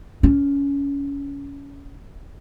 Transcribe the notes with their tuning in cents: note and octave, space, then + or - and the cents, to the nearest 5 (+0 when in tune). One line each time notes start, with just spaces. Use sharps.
C#4 +20